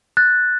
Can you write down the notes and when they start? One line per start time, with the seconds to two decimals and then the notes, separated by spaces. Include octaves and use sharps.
0.17 F#6 A6